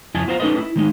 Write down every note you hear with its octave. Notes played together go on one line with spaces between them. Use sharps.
F2 C#3 E4 D#5 G#5 A5
B3 F4 C5 F5 A#5
C#4 D#4 E4 A4 B4 D#5
E4
D#3 G#3 D#4